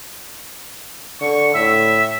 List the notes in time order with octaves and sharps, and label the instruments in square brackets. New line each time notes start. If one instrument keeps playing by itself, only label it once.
[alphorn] D3 [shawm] C#6
[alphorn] A2 [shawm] E5